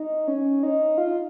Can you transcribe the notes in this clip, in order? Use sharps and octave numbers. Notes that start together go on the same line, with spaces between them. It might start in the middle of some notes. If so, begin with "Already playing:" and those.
Already playing: D#4
C#4
D#4
F4